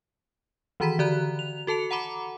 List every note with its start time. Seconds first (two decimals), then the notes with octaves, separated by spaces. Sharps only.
0.80 D#3 E3 F#4 A#5 B5 B6
0.99 D3 F#4 D5 A#5 F#6
1.39 F7
1.67 F#4 A4 A5 C#7 F7
1.91 F#5 A#5 B5 D6